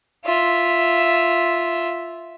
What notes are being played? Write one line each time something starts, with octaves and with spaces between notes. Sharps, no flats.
F4 E5